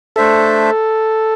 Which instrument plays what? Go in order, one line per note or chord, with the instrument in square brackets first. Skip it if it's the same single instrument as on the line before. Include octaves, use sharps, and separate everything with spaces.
[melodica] A3 D4 C5 E5 [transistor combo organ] A4